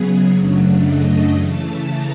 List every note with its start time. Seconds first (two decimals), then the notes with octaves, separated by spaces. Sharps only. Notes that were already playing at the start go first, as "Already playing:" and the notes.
Already playing: C#3 F#3 B3 G#4
0.32 F#2 C#3 F#3 A3 D4
0.82 D#5
1.33 C#3 E3 A3 A5
1.84 A#5